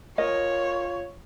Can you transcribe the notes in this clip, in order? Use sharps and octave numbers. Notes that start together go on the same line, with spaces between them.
F4 A#4 C#5 D#5